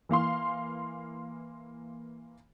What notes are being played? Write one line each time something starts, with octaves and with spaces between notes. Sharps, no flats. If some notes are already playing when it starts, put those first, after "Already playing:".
E3 A#3 F5 C6